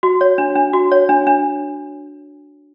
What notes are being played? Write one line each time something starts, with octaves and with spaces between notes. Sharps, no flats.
F#4
C#5
D4
D4
F#4
C#5
D4
D4